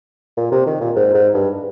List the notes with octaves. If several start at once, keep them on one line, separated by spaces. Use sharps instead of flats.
A#2
C3
D#3
A#2
G#2
G#2
G2